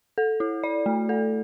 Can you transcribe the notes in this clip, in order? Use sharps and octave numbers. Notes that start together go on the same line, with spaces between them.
A4
E4
D5
A3
A4